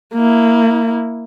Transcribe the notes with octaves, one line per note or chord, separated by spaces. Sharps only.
A#3 E4